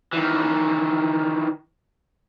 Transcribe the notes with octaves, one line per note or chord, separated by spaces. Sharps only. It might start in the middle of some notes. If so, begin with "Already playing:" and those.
D#3 E3